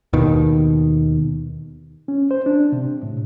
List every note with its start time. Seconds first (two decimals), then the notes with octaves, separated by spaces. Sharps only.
0.13 D#2 B2 D#3
2.08 C#4
2.31 C5
2.46 D4
2.72 C3
3.03 A2